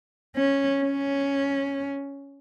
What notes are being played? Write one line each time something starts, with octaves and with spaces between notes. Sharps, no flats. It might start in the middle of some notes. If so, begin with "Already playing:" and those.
C#4
C#4